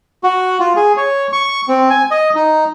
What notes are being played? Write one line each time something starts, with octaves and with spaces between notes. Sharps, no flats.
F#4
F4
G#4
C#5
C#6
C4
G#5
D#5
D#4